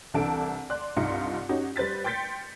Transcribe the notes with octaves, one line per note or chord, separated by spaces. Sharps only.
C2 E3 D4 A4 A5 D7
D5 C6 F#6
C2 G2 D#4 F4 C6 C#7
C#4 D#4 F#4 G4
G3 B4 C5 A6 B6
G5 C6 G6 A6 B6 C#7